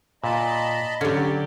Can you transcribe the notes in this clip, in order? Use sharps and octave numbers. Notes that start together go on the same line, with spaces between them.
A#2 D#5 A5 B5
D3 F#3 C#4 G4 D5